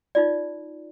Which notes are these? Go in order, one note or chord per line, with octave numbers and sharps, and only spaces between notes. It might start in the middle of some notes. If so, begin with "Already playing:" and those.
D#4 F4 D5